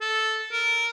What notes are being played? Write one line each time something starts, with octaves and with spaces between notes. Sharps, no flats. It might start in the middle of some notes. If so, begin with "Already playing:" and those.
A4
A#4